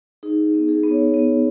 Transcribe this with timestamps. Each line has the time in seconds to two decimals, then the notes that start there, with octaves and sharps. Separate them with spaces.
0.23 D#4 G#4
0.54 B3
0.68 G#4
0.83 B3
0.91 C#5
1.14 B3